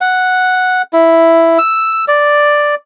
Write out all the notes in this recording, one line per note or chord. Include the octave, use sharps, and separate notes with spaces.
F#5
E4
E6
D5